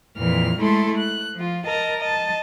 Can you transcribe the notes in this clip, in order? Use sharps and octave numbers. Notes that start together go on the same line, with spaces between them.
F2 A#2 E3 F6
G#3 A3 E4 A4 C6
F#6
F3 F4
A#4 D#5 A5 A#5
D#5 A5